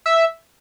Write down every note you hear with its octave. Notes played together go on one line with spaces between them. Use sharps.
E5